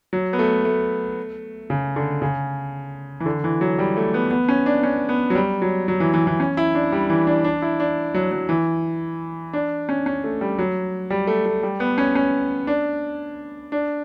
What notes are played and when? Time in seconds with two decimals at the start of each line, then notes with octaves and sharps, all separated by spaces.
0.13 F#3
0.33 B3
0.39 A3
0.65 A3
1.70 C#3
1.96 D3
2.22 C#3
3.20 E3
3.26 D3
3.44 E3
3.61 F#3
3.79 G3
3.97 A3
4.14 B3
4.31 B3
4.49 C#4
4.66 D4
4.83 C#4
5.09 B3
5.30 F#3
5.35 G3
5.62 F#3
5.88 F#3
6.00 E3
6.14 E3
6.27 E3
6.40 C#4
6.57 E4
6.75 D4
6.92 G3
7.10 E3
7.27 D4
7.44 D4
7.62 E4
7.80 D4
8.14 F#3
8.31 F#3
8.49 E3
9.53 D4
9.89 C#4
10.06 C#4
10.24 A3
10.41 G3
10.59 F#3
11.10 G3
11.27 A3
11.46 A3
11.63 G3
11.80 B3
11.98 C#4
12.15 C#4
12.67 D4
13.72 D4